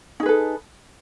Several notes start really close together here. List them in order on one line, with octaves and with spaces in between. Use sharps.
D#4 G#4 B4 A4